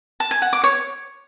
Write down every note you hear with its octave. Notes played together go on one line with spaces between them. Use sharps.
A5
G#5
F#5
D6
C#5